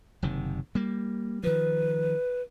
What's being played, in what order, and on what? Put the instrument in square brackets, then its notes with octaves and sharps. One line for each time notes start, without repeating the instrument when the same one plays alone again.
[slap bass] F#1 C3 D#3
G3 A#3
[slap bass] D#3 F3 [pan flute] B4